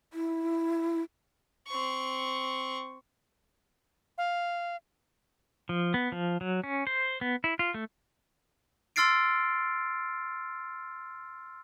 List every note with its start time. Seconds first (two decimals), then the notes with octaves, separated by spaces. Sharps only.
0.13 E4
1.67 C4 C#6
4.18 F5
5.69 F3
5.94 B3
6.12 F3
6.41 F#3
6.64 C#4
6.87 C5
7.21 B3
7.44 E4
7.59 F4
7.74 A3
8.96 C6 E6 F6 A6 C7 D7